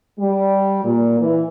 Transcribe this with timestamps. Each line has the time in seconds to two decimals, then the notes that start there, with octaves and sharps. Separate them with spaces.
0.19 G3
0.85 A#2
1.19 E3